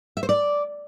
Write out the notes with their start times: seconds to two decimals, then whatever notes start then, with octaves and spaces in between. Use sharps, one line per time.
0.17 E5
0.23 C5
0.29 D5